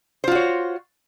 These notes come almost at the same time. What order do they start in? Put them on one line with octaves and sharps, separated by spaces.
C5 F4 F#4 C#5